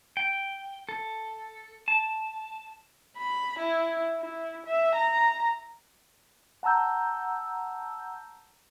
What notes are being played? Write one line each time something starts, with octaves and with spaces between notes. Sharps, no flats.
G5
A4
A5
B5
E4
E4
E5
A#5
F#5 A5 A#5 E6 G6